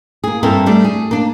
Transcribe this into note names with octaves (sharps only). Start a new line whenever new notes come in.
A#3 G#4
G2 A#3 C4 E4 A4 A#4
G3 A3 D4
G#4
A#3 D4